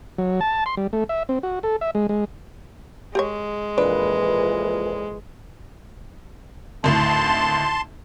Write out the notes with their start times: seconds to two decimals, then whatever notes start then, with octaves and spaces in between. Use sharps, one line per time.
0.18 F#3
0.41 A5
0.66 C6
0.77 G3
0.93 A3
1.09 E5
1.29 C4
1.43 F#4
1.63 A4
1.81 E5
1.95 G#3
2.09 G#3
3.15 G#3 G4 A#4 C#5
3.78 F2 A#2 E3 D4 B4
6.84 G#1 D2 A2 A5 C6